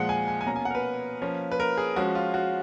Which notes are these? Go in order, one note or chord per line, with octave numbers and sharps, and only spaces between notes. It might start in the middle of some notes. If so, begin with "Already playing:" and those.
Already playing: A#2 F3 G#3 F#5
G#5
G#5
G#5
B2 A#3 C#4 A#5
G#5
F#5
A#4
B4
F3 A#3 C#4
B4
A#4
G#4
F3 G#3 C#4 F#4
F4
F#4